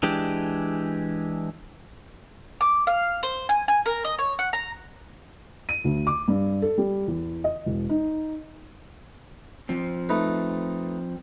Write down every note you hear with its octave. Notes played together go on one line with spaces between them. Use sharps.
E3 G#3 D4 G4
D6
F5
C5
G#5
G#5
A#4
D#5
C#5
F#5
A#5
D#7
D2
D6
G2
A4
G3
E2
D#5
E1
D#4
F3 C4
A3 D#4 B4